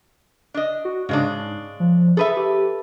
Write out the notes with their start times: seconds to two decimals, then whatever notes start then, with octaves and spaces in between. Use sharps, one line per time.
0.54 D4 D#5
0.85 F#4
1.09 G#2 C#3 G#3 D4
1.80 F3
2.17 G#4 A4 B4 E5
2.37 G4